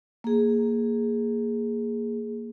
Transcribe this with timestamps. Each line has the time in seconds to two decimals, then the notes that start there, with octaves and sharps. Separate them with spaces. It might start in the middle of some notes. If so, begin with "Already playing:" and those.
0.24 A#3 G#4